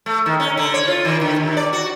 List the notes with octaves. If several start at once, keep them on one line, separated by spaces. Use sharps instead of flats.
A3
D#3
C#4
D3
C#5
F4
D#3
D3
D#2
D5
F#4